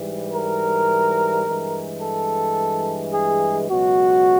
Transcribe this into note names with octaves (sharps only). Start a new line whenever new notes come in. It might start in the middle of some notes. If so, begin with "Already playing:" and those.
Already playing: G#2 E3 G3
A#4
G2 E3 G#3
A4
G#4
C#2 B2 F#3 F#4